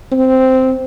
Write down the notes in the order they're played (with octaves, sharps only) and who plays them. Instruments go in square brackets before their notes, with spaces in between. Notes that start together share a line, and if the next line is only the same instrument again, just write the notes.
[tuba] C4